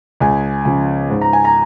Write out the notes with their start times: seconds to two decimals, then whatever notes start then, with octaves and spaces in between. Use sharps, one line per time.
0.20 C#2 G#5
0.65 C#3 F3 C#4 G#5
1.10 G#2
1.21 A#5
1.33 G#5
1.45 A#5